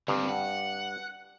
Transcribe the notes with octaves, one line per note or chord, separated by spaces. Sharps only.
G2 D3 C4
F#5